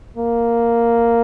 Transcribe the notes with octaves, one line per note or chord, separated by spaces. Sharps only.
A#3